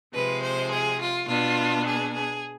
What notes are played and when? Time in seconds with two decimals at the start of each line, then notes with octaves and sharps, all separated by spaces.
0.13 C3 F3 G#3 B4
0.43 C5
0.71 G#4
1.00 F4
1.28 B2 B3 D4 F4
1.85 G#4
2.13 G#4